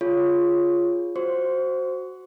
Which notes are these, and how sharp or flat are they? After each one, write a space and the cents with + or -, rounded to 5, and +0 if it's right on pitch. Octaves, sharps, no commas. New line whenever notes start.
F4 +0 G#4 +0 C#5 +0
F#4 +0 C5 +0 C#6 +40